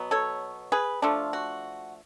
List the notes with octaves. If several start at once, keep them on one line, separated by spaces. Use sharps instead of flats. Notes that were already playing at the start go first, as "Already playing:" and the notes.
Already playing: B2 F#3 B3
A4 C#5
G#4 B4
F3 A3 D4 F4
F#4